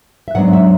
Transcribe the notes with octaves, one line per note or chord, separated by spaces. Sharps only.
E5
G#2 F#3 B3 D4 F#5
E5